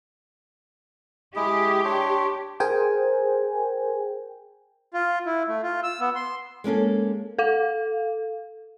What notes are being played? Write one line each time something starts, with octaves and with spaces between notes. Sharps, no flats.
G#3 E4 G4 G#4
D4 C#5 C6
G#4 A#4 C5 G5 G#5
F4
E4
A3
F4
E6
B3
C6
G#3 A#3 C#4 A4
A4 F5